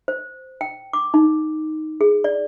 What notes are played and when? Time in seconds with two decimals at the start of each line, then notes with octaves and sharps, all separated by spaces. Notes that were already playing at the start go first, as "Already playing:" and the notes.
0.08 C5
0.61 G5
0.93 D6
1.14 D#4
2.01 G#4
2.24 D5